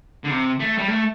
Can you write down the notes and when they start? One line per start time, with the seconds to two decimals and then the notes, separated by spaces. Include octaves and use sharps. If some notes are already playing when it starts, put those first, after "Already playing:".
0.24 D3
0.31 C3
0.60 A3
0.78 G3
0.88 A3